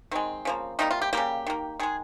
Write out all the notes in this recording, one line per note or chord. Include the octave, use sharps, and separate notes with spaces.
D#3 G#3 C4
C#3 F3 A#3
C3 G3 A#3 D#4
F4
G4
C#3 G3 A#3 G4
D#3 A#3
D#3 G#3 G#4